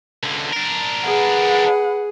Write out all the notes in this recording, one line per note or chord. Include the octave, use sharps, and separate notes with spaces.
C#2 D3
D4 A#4
G#4 B4 F#5